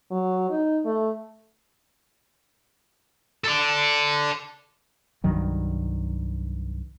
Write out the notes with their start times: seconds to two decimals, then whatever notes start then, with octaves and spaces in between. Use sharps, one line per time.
0.11 F#3
0.50 D#4
0.85 A3
3.44 A4 D5
5.24 C2 G2 D#3 F#3